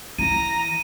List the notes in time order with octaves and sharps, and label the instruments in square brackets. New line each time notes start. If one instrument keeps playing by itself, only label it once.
[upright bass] E3 [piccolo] A#5 [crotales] D#7